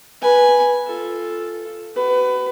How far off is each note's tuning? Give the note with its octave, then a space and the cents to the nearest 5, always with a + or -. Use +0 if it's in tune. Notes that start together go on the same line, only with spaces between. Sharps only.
B4 -10 G#5 +0
F4 +0 A4 +0
F#4 +35 B4 +25